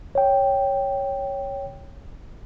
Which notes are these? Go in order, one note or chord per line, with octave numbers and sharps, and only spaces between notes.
C#5 G5